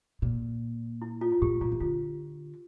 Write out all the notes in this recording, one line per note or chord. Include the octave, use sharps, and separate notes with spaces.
A#2
E4
F4
F4
A2 G4
A#2 F4
E3
D3 F4